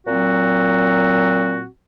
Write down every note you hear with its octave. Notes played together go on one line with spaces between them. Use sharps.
A#2 F#3 C4 F#4